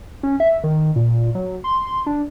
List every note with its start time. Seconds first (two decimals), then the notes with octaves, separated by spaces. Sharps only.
0.23 C#4
0.40 E5
0.64 D#3
0.96 A#2
1.35 F#3
1.64 C6
2.06 D4